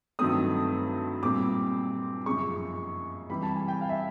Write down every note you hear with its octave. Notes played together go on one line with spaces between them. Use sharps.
G2 D#3 F#3 A3 C4 D#6
A#2 G3 C4 D6
F#2 C#3 F3 G#3 C#6
C3 E3 G3 B5
A5
G#5
G5
F5
E5